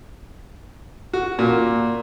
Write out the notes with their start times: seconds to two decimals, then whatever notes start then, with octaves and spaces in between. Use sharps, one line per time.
1.13 F#4
1.39 A#2